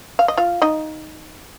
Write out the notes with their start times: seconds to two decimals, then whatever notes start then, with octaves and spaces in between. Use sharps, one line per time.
0.19 F5
0.28 D#5
0.37 F4 F5
0.62 D#4 D#5